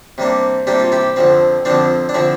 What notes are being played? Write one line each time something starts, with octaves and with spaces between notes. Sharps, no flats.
C3 G3 A#3 D4
C3 G3 A#3 D4 G4
F4
E4 G4
F2 D3 F3 C4
F2 D3 F3 C4 D4 F4
D4
D3 F3 C4 E4